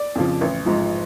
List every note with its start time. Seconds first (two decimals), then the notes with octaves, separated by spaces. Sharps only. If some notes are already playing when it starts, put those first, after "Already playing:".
Already playing: D5
0.15 F2 C#3 F3
0.41 A1
0.66 G#2 F3